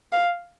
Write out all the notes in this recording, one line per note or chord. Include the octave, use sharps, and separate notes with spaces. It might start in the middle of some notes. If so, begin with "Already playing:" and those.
F5